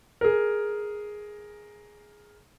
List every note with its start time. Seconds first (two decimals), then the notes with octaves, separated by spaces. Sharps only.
0.21 G#4 A#4